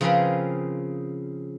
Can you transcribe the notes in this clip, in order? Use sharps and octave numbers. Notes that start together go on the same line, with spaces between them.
C#3 F3 C4 G#4 A#4 B4